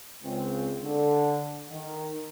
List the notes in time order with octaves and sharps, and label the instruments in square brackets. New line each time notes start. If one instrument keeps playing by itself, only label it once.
[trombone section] C#2 C#3 C4
D3
D#3